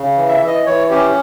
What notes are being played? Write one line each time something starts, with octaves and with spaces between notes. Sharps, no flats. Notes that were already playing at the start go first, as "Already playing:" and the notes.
Already playing: C#3
E3
E5
E3
D#5
E3 C#5
C#4 G4